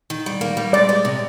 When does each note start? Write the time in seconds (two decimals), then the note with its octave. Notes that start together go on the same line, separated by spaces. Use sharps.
0.10 D#3
0.26 G3
0.41 A#3
0.57 G3
0.73 G#3 D5
0.89 G#3
1.05 C3